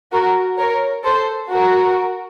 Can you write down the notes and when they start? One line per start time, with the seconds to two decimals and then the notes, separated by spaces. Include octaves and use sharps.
0.12 F#4 A#4
0.58 A#4 C#5
1.04 A4 C5
1.50 F#4 A#4